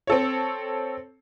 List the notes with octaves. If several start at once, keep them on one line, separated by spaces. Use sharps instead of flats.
C4 A4 C#5